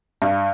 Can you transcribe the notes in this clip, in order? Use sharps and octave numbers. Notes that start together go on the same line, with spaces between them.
G2